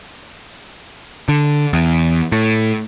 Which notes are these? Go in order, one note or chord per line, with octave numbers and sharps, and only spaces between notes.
D3
E2
A2